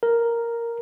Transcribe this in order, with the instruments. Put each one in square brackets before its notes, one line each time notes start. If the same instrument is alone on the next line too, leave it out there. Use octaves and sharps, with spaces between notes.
[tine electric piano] A#4